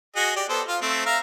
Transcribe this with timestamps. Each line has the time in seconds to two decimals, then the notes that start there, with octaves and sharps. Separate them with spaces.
0.16 F#4 G#4 D#5
0.36 G4 D5
0.49 B3 A4 C5
0.68 F4 F5
0.82 A3 C4
1.06 E5 F5 A#5